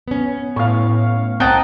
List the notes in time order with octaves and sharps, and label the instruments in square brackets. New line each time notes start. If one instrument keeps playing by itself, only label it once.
[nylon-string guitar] B3 C#4
[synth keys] A2 [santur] F5 C#6
[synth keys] C2 D#6 [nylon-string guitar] C4 [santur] D#5 F#5 A#5 [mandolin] G5 A5